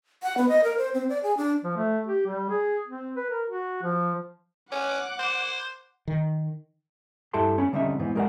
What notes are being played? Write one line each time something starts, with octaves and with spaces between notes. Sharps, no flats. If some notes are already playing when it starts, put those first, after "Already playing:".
F#5
B3
D#5
A#4
C5
C4
D5
G#4
D4
F3
A3
G4
G3
G#4
C4
B4
A#4
F#4
F3
C#4 F#5 D6
C5
D#3
G2 E4 G4 A4 A5 C6
C#4 B5
D3 G3 C4 C#4 D#4 E5
G#2 E3 B3 C4
G#3 G4 A#4 C#5 D5 F#5